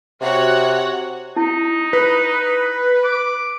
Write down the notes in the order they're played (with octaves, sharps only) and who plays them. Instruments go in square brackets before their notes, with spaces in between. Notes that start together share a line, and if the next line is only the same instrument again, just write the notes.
[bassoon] C3 [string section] F#4 C#5 F#5
[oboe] D#4 [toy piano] E4
[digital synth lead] B4
[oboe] D6